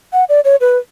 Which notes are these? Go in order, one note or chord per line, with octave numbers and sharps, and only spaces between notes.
F#5
D5
C#5
B4